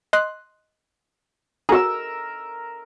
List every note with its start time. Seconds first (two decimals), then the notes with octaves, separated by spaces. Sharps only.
0.13 D#5 C6 F#6
1.69 F#4 G#4 A#4 E6